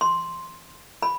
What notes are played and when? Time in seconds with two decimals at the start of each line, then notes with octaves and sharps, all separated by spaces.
0.01 C6
1.03 B5